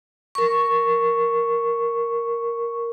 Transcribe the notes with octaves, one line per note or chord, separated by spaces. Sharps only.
A#4 C#6